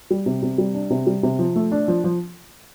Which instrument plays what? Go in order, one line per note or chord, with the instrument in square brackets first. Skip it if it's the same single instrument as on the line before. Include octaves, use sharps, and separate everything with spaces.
[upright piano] G3
C3
C3
G3
D4
C3
G3
C3
F3
A3
D4
F3
F3